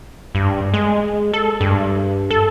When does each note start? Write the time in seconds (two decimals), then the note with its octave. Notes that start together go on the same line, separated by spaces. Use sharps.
0.35 G2
0.74 G#3
1.33 A4
1.61 G2
2.30 A4